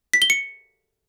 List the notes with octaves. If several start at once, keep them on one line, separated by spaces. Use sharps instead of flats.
B6
G7
C#7